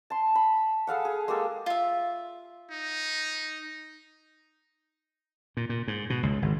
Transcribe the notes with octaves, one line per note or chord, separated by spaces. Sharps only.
A5 C6
B5
G#4 A4 F5 F#5
G#4
G#3 A#3 G4 A4
F4 E5
D#4
A#2
A#2
G#2
B2
C#2
G#1